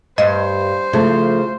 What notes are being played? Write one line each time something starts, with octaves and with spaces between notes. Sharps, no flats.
G2 C5 D#5
C#3 F3 A3